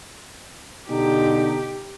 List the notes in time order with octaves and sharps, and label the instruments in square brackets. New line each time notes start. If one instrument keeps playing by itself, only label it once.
[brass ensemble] B2 D3 D#4 [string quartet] G4